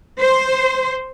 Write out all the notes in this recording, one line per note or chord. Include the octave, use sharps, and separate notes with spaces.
C5